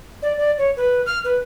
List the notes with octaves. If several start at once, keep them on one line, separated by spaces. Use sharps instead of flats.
D5
D5
C#5
B4
F6
B4